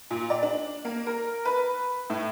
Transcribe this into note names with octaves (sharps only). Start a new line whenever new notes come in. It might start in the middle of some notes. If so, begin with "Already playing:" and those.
A#2
D5
D4
A#3
A#4
B4
A2